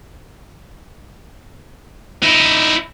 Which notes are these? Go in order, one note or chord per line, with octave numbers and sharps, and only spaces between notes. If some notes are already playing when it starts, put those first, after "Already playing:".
D#4 E4